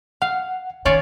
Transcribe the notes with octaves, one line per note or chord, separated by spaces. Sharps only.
F5 F#5
D#3 C#4 F4 C#5 D5